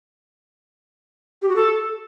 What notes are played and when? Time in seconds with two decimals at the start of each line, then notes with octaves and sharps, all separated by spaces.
1.42 G4
1.49 F#4
1.56 A4